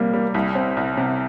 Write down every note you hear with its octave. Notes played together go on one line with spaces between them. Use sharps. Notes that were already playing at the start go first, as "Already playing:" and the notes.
Already playing: C3 G3 A#3
G3
C2
C4
C2
C3